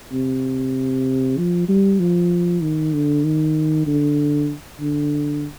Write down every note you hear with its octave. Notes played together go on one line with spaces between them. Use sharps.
C3
F3
G3
F3
D#3
D3
D#3
D3
D3